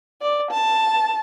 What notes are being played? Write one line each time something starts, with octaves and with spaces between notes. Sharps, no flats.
D5
A5